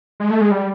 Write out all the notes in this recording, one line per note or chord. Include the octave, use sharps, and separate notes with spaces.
G#3
A3
G#3
G3